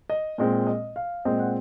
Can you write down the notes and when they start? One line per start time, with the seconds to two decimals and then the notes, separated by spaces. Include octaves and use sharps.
0.10 D#5
0.38 A#2 G#3 C4
0.67 D#5
0.96 F5
1.25 A#2 G#3 C4 D#5
1.39 F#5